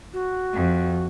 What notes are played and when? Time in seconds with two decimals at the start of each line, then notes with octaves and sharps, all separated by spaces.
0.13 F#4
0.54 F2